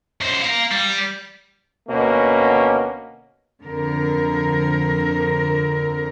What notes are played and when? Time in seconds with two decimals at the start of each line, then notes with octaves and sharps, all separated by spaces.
0.21 F#2 C5
0.42 F5 A#5
0.72 G3
1.88 D2 B2 A#3 C#4
3.63 F2 D3 A#4